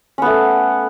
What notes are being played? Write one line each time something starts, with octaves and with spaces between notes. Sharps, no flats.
A3 B3 C#4